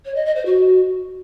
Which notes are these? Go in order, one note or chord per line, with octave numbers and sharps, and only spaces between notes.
C#5
D#5
D#5
C5
F#4